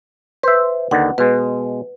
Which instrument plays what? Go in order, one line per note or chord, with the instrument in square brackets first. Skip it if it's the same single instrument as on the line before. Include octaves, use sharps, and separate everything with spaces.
[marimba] B4 [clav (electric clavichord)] C5 E5
[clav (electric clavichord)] D#2 D3 D#3 [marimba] F#5
[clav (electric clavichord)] B2 G#3 [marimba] B4